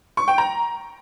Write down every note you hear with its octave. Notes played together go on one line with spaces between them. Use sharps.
C#6
G5
A#5